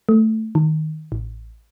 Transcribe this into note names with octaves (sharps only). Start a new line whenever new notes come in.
A3
D#3
A1